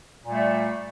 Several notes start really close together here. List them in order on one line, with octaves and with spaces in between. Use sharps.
A#2 G3 A3